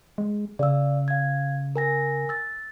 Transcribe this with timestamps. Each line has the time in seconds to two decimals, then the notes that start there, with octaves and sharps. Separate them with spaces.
0.18 G#3
0.59 C#3 D5 F5 E6
1.08 F5 G#6
1.76 A#4 G#5 A#6
2.29 E6 A6